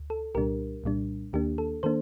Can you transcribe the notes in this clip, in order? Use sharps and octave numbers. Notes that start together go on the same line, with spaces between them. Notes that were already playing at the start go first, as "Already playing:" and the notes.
Already playing: D2
A4
C2 A#2 G3 D4 G4 A#4
C2 A#2 G3 D4
D#2 D#3 A#3 D4 G4
A4
D#3 A#3 D4 A4 C5